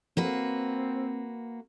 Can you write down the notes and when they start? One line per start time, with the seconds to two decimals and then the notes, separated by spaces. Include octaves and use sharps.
0.17 A#3 C4 F#4 B4